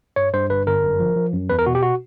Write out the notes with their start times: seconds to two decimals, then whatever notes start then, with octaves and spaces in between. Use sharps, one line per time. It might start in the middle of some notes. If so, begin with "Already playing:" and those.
0.16 G2 C#5
0.33 G2 C5
0.50 G1 B4
0.66 G1 A#4
0.83 F#2
1.00 F3
1.16 F3
1.34 F#2
1.49 E2 B4
1.59 A#4
1.66 B2 F#4
1.75 G4
1.82 F#4